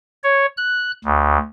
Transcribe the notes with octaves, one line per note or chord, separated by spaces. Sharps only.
C#5
F#6
D2